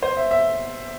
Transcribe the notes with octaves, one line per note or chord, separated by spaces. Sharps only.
C5
E5
E5